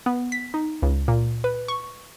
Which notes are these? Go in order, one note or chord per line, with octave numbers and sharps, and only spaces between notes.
B3
B6
D#4
C#2
A#2
B4
C#6